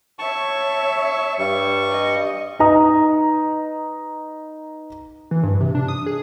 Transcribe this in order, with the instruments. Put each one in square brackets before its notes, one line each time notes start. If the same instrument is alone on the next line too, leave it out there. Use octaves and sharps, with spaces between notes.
[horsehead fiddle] C#5 E5 [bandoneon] A5 C#6
[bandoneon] G2 G3 C#6
[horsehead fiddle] D#5
[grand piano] D#4 B4 D#5 A#5 D#6
[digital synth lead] E3
G2
C3
D4
D#6
G#4